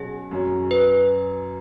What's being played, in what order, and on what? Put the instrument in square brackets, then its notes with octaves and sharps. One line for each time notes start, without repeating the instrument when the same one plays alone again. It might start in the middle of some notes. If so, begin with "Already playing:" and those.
Already playing: [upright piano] B2 F#3 C#4 F#4 [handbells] G#4
[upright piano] F#2 F#3 C#4
[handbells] B4